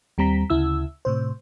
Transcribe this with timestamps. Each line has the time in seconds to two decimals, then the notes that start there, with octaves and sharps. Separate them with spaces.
0.18 D#2 G3 C4 A#5 B6
0.50 D2 C#3 E4 E6
1.05 A2 C3 C5